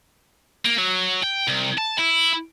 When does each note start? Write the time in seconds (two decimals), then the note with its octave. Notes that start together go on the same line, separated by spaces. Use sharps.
0.65 A#3
0.78 F#3
1.24 G5
1.48 C2
1.78 A5
1.99 E4